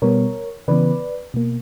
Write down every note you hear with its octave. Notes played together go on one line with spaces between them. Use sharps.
B2 G3 B3 A#4 C#5
C#3 E3 B3 B4 D5
B2 A#3